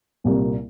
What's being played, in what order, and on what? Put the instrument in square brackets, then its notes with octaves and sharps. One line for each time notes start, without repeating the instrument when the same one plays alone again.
[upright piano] C2 A#2 G3 A#3